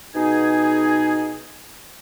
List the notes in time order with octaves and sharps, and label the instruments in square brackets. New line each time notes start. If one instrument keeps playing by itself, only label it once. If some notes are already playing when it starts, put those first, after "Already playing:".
[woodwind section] B2 D#4 G#4 G#5